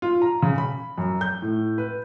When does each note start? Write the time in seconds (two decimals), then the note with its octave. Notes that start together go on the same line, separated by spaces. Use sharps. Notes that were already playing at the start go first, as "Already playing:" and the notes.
0.02 F4
0.22 A#5
0.42 C#3
0.58 B5
0.98 F#2
1.21 G6
1.42 A2
1.78 B4